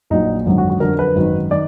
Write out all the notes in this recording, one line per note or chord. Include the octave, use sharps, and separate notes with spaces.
A#1 A#2 F#3 D#4
G#1 F#2 D3 F#3
F#4
F#4
F2 D3 F#3 A#4
B4
G#1 F#2 D#3 F#3
D#3 D5